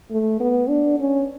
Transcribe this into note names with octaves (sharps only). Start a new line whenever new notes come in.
A3
B3
D4
C#4